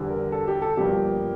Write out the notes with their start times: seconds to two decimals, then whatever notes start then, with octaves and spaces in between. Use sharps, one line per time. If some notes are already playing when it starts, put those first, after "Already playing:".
Already playing: E2 D3 G3
0.09 A#4
0.32 A4
0.48 G4
0.62 A4
0.77 G1 G2 F3 A#3 G4